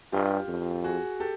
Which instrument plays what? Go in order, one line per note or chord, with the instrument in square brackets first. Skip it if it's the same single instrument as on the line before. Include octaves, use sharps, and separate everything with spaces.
[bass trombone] G2 [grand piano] F4 G4
[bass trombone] F2
[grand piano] F#4 G#4
G4 A4